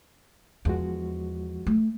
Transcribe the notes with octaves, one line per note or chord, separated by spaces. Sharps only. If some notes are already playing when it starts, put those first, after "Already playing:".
E2 F3 G#3 F#4
A3